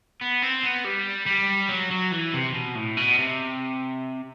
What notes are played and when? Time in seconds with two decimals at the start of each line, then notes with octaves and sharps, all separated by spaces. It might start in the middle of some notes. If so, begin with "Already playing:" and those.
0.21 B3
0.42 C4
0.63 B3
0.85 G3
1.26 G3
1.69 F#3
1.91 F#3
2.12 E3
2.34 C3
2.54 B2
2.75 A2
2.97 B2
3.19 C3